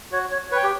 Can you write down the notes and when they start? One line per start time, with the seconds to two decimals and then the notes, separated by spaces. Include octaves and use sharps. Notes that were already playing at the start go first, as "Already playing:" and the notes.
0.12 F#4 C#5
0.32 C#5
0.51 B4 C#5
0.56 G5
0.63 G4